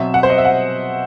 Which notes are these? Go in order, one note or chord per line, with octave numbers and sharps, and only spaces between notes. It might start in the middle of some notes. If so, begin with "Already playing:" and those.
Already playing: B2 F#3 C4 E5
F#5
C5
D#5
E5
F#5